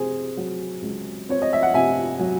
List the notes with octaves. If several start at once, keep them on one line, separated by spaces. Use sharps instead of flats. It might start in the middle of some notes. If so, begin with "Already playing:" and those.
Already playing: C3 C4 G#4 C5
F#3
C#2
C4 C#5
D#5
E5
F#5
C3 E5 G#5
F#3